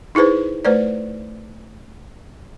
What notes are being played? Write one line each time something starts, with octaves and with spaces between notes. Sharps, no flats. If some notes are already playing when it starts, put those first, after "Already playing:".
D#4 E4 G#4 B4 C5
A3 B4 C5 D5